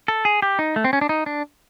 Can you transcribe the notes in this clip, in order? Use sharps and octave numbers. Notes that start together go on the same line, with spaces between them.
A4
G#4
G4
D#4
A3
C4
C#4
D4
D#4
D4